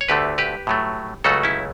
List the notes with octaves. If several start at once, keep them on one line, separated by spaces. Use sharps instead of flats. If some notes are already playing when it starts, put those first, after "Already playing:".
C#5
D2 D3 A3 G4 B4
G4 B4
A2 F#3 A3
C#2 C#3 F#3 A3 F#4 A4
C#4 E4